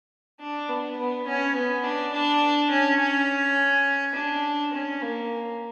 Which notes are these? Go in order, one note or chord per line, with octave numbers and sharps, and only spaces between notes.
D4
B3
B3
C#4
B3
D4
D4
C#4
C#4
D4
C#4
A#3